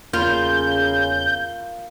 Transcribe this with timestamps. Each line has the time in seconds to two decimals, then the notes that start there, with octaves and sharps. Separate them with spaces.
0.13 E2 C#3 A#3 F4 G6